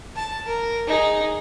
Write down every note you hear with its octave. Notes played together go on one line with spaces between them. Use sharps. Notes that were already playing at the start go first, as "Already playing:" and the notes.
A5
A#4
D#4 G#4